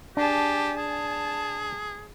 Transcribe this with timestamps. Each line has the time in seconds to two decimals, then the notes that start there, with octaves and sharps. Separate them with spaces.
0.17 D4 G4 G#4 A5
0.78 G#4 A5